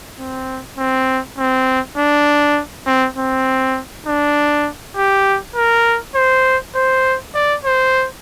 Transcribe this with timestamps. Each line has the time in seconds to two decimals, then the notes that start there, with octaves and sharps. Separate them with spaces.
0.19 C4
0.78 C4
1.38 C4
1.97 D4
2.87 C4
3.17 C4
4.06 D4
4.96 G4
5.56 A#4
6.15 C5
6.75 C5
7.35 D5
7.65 C5